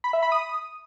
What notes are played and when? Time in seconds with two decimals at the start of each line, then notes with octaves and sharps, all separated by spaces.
0.04 B5
0.13 E5
0.23 B5
0.32 D#6